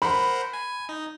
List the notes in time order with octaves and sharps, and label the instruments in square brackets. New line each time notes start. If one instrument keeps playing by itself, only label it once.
[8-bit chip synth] A#4 C5 F#5 [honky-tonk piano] B5
[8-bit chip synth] G#5
D#4